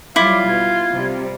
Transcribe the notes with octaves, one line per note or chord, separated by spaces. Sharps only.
F#3 G3 E4 F4 D6
B2 G#6
C3 G3